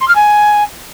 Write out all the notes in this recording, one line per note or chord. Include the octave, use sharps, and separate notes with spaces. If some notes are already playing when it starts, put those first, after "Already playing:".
C6
F6
G#5